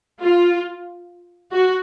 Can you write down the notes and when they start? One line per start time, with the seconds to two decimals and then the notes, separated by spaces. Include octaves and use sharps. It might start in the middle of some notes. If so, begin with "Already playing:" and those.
0.20 F4
1.52 F#4